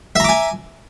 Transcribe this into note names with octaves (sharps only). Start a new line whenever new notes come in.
E5 G#5 A#5 D6